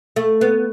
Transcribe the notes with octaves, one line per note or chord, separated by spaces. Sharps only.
A3
B3